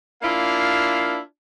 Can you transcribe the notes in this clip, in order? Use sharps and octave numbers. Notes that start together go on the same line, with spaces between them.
A#3 D4 E4 F4 F5